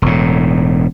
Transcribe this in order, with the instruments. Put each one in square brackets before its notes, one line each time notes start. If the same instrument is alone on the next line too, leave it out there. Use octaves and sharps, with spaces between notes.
[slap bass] E1 A2